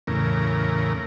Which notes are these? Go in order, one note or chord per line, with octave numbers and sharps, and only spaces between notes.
E2 A2 C#3 A#4